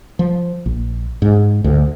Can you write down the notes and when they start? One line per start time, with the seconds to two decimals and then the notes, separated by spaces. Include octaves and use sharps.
0.19 F3
0.66 A#1
1.22 G#2
1.64 D2